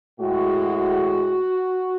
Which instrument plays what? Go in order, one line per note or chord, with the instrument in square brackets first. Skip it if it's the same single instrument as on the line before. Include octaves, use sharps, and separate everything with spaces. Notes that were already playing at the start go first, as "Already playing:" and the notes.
[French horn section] A2 G#3 F#4